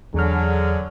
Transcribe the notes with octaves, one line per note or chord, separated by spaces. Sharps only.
E2 D3 F#3 G#4 F6